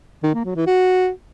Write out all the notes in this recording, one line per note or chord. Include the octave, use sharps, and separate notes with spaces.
D#3
A#3
F#3
E3
F#4